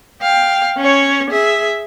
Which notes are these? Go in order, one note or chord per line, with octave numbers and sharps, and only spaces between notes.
F5 G5
C#4 C#5
G#4 E5